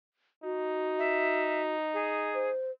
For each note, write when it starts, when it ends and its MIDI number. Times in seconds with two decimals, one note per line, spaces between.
0.43 2.57 63
0.43 1.75 66
0.98 1.62 76
1.93 2.50 68
2.34 2.71 72